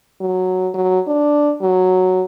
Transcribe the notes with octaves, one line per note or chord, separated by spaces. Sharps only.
F#3
F#3
D4
F#3